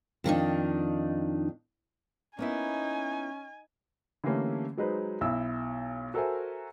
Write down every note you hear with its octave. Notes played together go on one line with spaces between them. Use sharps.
F2 D#3 D4 D#4
A#3 B3 C#4 D#4 E4 G#5
D3 E3 G3 A3 A#3 C#4
F#3 G#3 D#4 B4 C5
B1 E4 F5 E6
F#4 A4 A#4 C5 E5 G#5